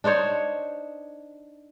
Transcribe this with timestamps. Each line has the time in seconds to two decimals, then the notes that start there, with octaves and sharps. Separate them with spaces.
0.04 D4 D#4 C5 C#5